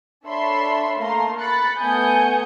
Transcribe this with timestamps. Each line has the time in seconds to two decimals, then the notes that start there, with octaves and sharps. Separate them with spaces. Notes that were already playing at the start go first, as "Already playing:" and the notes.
0.25 D4 A4 C#5 E5 B5 C6
0.97 A3 A#3 F5 A#5 C6
1.39 B5 F#6 A6 C#7
1.78 A3 B3 G#5 D#6 G6 C#7